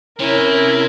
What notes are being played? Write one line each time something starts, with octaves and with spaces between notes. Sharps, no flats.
C3 C#4 E4 A#4